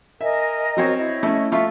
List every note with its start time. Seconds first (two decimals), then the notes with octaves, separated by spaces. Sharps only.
0.21 A#4 D#5 E5 G#5
0.77 F#3 C4 C#5
0.98 E4 D#5
1.23 A3 C#4
1.52 A3 F4 E5 C#6